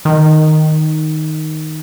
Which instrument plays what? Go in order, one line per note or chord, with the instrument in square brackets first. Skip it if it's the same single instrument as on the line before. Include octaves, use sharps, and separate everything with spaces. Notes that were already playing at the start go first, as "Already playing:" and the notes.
[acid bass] D#3